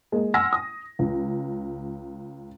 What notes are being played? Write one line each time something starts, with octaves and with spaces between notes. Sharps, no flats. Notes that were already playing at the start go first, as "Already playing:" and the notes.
G#3 A#3 G#4
F#5 G#5 C6 E6 F6 A#6
D#6
C#2